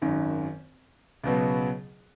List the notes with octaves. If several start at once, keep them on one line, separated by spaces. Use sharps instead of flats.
G#1 F#2 D#3
C#2 B2 F#3 B3